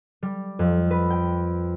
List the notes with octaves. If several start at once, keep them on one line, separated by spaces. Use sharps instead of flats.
G3
F2
B4
G5